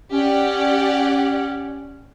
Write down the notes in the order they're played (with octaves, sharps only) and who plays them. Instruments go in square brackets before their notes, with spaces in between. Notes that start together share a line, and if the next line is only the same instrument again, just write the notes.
[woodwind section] C#4 [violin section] G4 D5 F#5